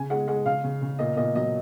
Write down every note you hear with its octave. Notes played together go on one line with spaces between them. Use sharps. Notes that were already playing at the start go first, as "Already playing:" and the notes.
Already playing: C#3 G#5
G#3 F#5
G#3 F#5
C#3 F5
C#3
C#3
A#2 D#5
A#2 D#5
F#3 D#5